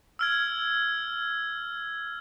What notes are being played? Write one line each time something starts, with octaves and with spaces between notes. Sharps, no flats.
E6 F6 G#6